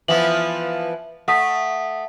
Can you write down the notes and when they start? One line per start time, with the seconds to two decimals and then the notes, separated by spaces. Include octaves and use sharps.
0.08 E3 F3 B3 E5 F#7
1.28 A3 F#5 D#6 B6